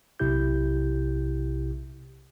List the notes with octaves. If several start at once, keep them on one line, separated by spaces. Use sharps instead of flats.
B1 C3 E4 G4 G6